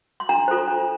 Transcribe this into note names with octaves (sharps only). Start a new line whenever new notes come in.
C6
D4 A#5
F4 A4 C5
D4